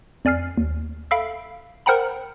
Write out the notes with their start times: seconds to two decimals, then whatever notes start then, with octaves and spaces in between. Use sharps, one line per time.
0.25 F2 D5 G#5 F6 C7
0.57 D#2
1.11 A4 E5 F5 B5 D7
1.86 A#4 C5 F#5 G5 A#5 B5